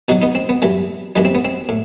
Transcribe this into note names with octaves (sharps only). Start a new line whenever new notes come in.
B2 F#3 D#4 F#4
B3 D#4
C4
B3
F#2 E3 G3
F#2 E3 G3 D#4
C4
B3
C4
A2